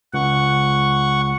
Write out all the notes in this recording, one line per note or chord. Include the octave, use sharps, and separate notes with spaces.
C#2 F#5 C#6